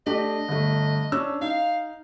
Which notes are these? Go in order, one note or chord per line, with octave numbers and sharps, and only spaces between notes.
A3 D4 G4 D#5
G1 A3
C#4 D4 E6
D#4 F5